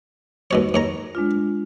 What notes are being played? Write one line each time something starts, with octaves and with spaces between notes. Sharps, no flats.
D#2 B2 C#5
D#2 C#5 A#5
G#3 D4 F4